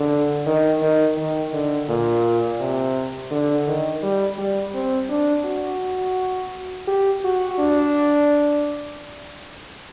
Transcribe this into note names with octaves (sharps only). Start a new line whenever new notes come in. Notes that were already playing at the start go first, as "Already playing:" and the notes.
Already playing: D3
D#3
D#3
D#3
D3
A#2
C3
D3
D#3
G3
G3
C4
D4
F#4
G4
F#4
D4